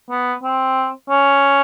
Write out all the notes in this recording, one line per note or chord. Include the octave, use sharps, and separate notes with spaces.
B3
C4
C#4